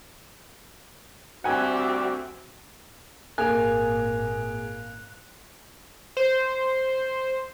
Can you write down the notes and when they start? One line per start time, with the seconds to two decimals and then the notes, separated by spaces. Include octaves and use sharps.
1.44 D2 G3 C4 F#4 G4 E5 F#5 G#5
3.38 G#1 A#2 A#3 G#4 G#5 F#6 F7
6.17 C5